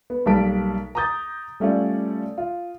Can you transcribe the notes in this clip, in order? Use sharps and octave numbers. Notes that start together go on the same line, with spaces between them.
B3
B1 G3 A#3 A5 B6 D7
A#5 D6 D#6 G6 A6
G3 A3 C#4 F4 D5
F4